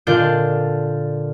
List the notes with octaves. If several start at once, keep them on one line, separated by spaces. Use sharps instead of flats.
A#2 D3 D4 F4 G6 D7